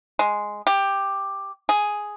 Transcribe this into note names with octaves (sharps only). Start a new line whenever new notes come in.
G#3
G4
G#4